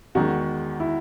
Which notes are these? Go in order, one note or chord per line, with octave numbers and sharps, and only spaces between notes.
E2 D#3 G#3 F#4
E4